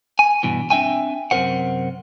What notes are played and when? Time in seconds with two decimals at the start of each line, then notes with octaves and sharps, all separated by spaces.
0.19 G#5
0.43 G2 B2 E3
0.70 C4 D4 E5 G5 G#5
1.31 F#2 C3 G#3 A#4 C5 F#5